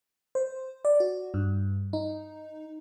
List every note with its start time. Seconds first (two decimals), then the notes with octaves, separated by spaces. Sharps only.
0.35 C5
0.85 D5
1.00 F#4
1.34 G2
1.93 D#4